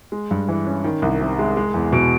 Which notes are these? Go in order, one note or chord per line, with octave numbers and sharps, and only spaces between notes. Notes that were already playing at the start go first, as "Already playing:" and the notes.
G#3
G2
E3
C#4
D#3
C2
C3
G#3
G#3
E2
B2